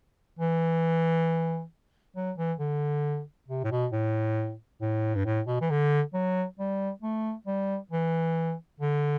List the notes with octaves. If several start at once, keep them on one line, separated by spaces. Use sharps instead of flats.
E3
F#3
E3
D3
C3
A2
B2
A2
A2
G2
A2
B2
E3
D3
F#3
G3
A3
G3
E3
D3